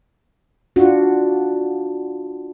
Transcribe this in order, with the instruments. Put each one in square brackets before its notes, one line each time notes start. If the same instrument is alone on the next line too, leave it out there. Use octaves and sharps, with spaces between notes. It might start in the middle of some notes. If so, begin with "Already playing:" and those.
[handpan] D4 F4 F#4